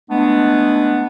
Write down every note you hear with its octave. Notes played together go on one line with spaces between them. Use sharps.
G#3 A3 B3 D4